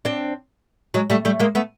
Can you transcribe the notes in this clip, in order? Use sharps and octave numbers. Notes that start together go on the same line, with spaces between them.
C4 D4
F#3 G#3
G3 A3
G3 A3
G#3 A#3
A3 B3